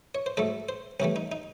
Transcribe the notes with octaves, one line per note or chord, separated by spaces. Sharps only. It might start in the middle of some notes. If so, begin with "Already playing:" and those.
C#5
C5
G#2 F#3 A3 A4
C5
C2 C3 E3 A3 C#4
D#4
D#4